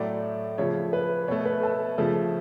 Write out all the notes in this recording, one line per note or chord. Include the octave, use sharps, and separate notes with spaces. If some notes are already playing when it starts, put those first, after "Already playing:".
Already playing: A2 F#3 A3 D5
C#3 F3 A3 C#5
B4
B2 A3 C#5
B4
A4
C#3 F3 A3